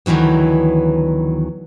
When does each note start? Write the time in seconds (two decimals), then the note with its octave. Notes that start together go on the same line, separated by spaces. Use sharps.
0.06 D2 D#3 E3 F#3 B3